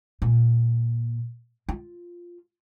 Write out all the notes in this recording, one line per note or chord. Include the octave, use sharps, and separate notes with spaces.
A#2
F4